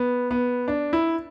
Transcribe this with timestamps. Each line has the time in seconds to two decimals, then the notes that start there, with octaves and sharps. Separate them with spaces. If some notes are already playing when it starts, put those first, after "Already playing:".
Already playing: B3
0.31 B3
0.68 D4
0.93 E4